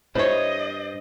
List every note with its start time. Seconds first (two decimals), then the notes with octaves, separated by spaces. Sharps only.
0.15 G2 E4 C5 C#5 D#5